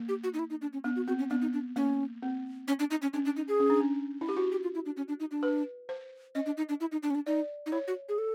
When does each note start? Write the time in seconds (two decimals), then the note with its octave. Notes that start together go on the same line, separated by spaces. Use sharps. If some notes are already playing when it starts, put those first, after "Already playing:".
Already playing: A#3
0.08 G4
0.24 F#4
0.34 D#4
0.39 E4
0.50 D#4
0.62 D4
0.73 C#4
0.84 B3 D4
0.96 F#4
1.07 C4 F#4
1.19 C#4
1.30 B3 D4
1.42 D#4
1.53 D4
1.76 A#3 C#4
2.22 C4
2.68 C#4
2.79 D4
2.91 D#4
3.02 C#4
3.13 C#4 D4
3.25 D4
3.36 D#4
3.48 G#4
3.60 C#4
3.70 D4
3.80 C#4
4.21 E4
4.29 G4
4.37 F#4
4.52 G4
4.63 F4
4.75 E4
4.86 D4
4.97 C#4
5.08 D4
5.20 D#4
5.31 D4
5.43 B4
5.89 C5
6.35 C#4 D#5
6.46 D4
6.57 D#4
6.69 D4
6.81 E4
6.92 D#4
7.03 D4
7.10 C#4
7.15 D4
7.26 D#4 D5
7.66 D#4
7.72 E4 C#5
7.88 F#4
8.09 G#4
8.18 A4